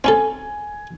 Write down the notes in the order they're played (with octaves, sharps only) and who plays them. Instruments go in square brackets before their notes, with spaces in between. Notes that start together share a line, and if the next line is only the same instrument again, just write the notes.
[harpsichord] C4 C#4 A4 [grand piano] G#5